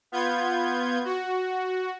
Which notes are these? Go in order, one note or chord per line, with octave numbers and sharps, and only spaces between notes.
B3 F4 G6 G#6
F#4